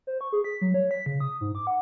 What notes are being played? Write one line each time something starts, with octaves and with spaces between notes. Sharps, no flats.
C5
C#6
G#4
B6
F#3
C#5
B6
C#3
D#6
G#2
D6
F#5